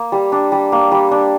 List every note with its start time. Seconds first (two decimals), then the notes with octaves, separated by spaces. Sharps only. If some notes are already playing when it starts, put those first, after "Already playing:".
Already playing: A#3
0.12 G3
0.32 D4
0.52 G3
0.72 A#3
0.92 G3
1.11 D4